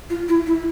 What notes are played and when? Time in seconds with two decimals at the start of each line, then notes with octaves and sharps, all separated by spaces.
0.10 F4
0.28 E4
0.46 E4